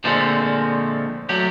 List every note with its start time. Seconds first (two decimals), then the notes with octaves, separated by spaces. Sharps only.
0.04 A#2 D3 F3 G#3 A3 C4
1.29 F#3 A3 G4